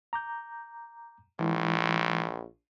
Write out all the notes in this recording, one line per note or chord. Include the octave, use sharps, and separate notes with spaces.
A#5 D6 G6
A#1 E3 G#3 E4